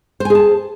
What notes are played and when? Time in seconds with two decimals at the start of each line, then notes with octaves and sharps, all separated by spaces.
0.20 C5
0.25 G#5
0.30 G#4
0.35 A5